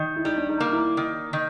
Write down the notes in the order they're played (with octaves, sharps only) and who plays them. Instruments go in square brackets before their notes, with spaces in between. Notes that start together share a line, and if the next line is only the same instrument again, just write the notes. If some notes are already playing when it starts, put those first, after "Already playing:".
Already playing: [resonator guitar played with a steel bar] D#3
[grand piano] E4
[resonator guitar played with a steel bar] G3 [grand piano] D#4
[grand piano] D4
D#4
[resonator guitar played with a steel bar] A#3
[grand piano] E4
[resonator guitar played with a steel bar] D#3
D#3